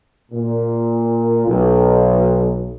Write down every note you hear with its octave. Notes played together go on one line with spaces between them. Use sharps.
A#2
B1